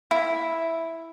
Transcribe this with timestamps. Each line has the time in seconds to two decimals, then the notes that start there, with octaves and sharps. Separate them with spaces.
0.11 E4